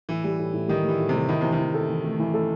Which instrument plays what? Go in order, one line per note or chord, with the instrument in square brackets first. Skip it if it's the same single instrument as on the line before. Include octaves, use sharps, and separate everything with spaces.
[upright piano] A2 [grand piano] E3
[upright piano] G3
A2
A2
[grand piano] D#3 [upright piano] G3
[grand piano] E3 [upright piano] G3
[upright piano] A2
[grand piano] C3
[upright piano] G3
[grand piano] D#3 [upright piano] E4
[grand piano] C3 [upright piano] E3
[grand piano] D#3
[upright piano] E3
A4
E3
A3
E3
A4